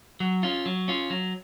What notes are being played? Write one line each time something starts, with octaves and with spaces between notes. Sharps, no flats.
F#3
C#4 F4
F#3
C#4 F4
F#3